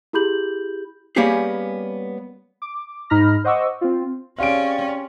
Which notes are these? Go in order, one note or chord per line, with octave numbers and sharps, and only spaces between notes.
E4 G4 G#4 B5 G6 F#7
G3 A#3 B3 C#4 G4 G#4
D6
G#2 D#4 A#5 B5 F6 A#6
C5 D#5 F#5 C#6 D6 E6
C4 F4
C4 C#4 G4 G#4 D5 F5 D7